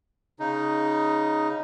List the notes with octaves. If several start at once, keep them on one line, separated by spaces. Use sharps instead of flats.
C#3 D#4